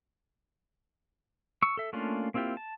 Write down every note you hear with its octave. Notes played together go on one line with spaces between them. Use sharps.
C#6 E6
A4 E5
A3 A#3 C#4 D4 F4
A#3 C4 E4 F4 G4
A5